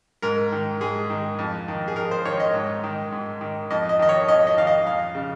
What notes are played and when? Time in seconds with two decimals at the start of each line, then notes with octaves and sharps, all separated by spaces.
0.22 G#2 A#4
0.52 D#3
0.81 G#2 G#4
1.10 D#3
1.39 F2
1.68 D#3
1.88 G#4
1.96 F2 A#4
2.11 C5
2.25 D#3 C#5
2.40 D#5
2.54 G#2
2.84 D#3
3.12 G#2
3.41 D#3
3.70 F2 D#5
3.89 D#5
3.99 D#3 D#5
4.09 C#5
4.28 F2 D#5
4.47 D#5
4.57 D#3 F5
4.67 D#5
4.86 F2 F5
5.15 C#3